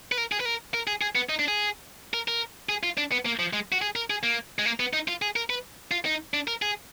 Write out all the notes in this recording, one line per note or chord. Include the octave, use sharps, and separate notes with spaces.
B4
A#4
G#4
B4
A#4
A#4
G#4
G#4
B3
D#4
D4
G#4
A#4
A#4
G#4
F4
D4
B3
A#3
F3
G#3
F#4
G#4
A#4
G#4
A#3
G#3
A#3
B3
D#4
F4
G#4
A#4
B4
F4
D#4
D4
A#4
G#4